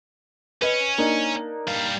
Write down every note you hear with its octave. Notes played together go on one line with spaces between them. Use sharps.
C#4 B4 D#5
A#3 D4 D#4
G3 F5